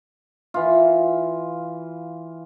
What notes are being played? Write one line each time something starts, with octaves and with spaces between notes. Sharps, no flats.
E3 F4